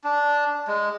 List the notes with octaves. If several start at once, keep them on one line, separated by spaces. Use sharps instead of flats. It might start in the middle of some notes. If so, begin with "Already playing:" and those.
D4
G#3